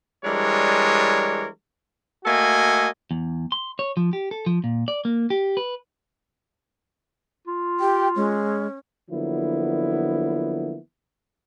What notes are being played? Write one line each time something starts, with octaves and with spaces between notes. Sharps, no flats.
E3 G3 G#3 D4 A#4 C#5
A3 A#3 F#4 A4 D#5 G#5
E2
C6
C#5
F3
G4
A4
F3
A#2
D5
A#3
G4
B4
F4
G4 G5
G#3 C#4
D3 F3 F#3 A#3 B3 E4